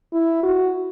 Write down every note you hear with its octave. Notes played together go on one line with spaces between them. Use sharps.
E4
F#4